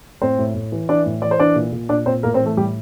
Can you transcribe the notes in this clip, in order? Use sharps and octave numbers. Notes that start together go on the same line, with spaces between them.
A2 C4 C5
A2
A2
E3
E3 D4 D5
A2
E3 D5
C5
E3 D4 D5
A#2
A#2
A#2 D4 D5
A#2 C4 C5
A2 A#3 A#4
C4 C5
E3
A3 A4
A2 G3 G4